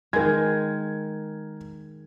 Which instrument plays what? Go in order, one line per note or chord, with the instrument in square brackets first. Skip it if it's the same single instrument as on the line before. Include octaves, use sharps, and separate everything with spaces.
[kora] D#3 G#3 [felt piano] A#4 G#6